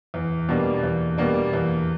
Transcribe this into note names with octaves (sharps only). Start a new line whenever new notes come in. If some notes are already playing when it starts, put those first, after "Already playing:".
E2
B2 G3 A#3 D4
E2
B2 G3 A#3 D4
E2